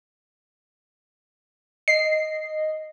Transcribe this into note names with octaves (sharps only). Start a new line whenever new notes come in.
D#5 C7